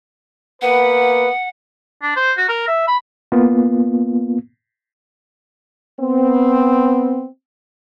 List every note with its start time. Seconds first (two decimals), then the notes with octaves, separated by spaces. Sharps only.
0.62 A#3 B3 B4 F#5
2.02 D4
2.16 C5
2.37 F#4
2.49 A#4
2.67 E5
2.87 B5
3.32 A#3 B3 F4
6.01 B3 C4